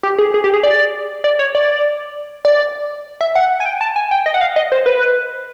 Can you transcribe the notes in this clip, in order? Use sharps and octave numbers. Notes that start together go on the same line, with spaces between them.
G4
G#4
G#4
G4
G#4
D5
D5
C#5
D5
D5
E5
F#5
G#5
G5
A5
G#5
G5
D#5
F#5
F5
D#5
C5
B4